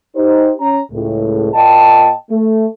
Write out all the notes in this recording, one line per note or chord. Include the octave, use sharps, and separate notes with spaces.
D#4 G4 C5
C#4 A#5
C#2 A2
A#2 D#5 G5 A5
A3